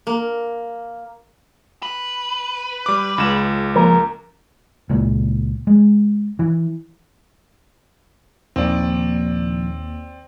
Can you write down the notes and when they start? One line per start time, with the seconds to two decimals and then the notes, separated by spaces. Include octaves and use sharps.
0.07 A#3
1.83 B4
2.86 G3 D6
3.18 C#2 E7
3.76 F3 A#3 A#4 G#5
4.90 C#2 A#2
5.67 G#3
6.39 E3
8.56 A#1 D#2 C4 D5